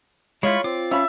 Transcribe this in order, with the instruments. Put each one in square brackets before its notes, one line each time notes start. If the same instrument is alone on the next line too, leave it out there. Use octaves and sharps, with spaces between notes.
[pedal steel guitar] G#3 E4 [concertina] F4 B5 C#6 [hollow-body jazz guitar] C#5
[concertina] C4 [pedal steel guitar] F4 D6
[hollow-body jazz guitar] C#4 F5 B5 [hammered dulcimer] E5